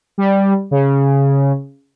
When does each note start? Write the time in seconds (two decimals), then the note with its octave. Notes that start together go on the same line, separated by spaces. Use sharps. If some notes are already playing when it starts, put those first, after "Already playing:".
0.18 G3
0.71 C#3